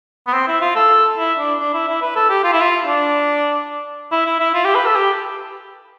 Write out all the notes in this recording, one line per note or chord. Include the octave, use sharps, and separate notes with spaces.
B3
C4
E4
F4
A4
E4
D4
D4
E4
E4
B4
A4
G4
F4
E4
F4
D4
E4
E4
E4
F4
G4
B4
A4
G4